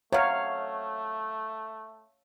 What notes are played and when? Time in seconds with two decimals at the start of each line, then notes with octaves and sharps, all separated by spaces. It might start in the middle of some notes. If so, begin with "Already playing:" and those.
0.12 C3 F#3 A3 C#5 F5